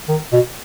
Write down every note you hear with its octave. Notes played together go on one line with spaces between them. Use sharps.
D#3
B2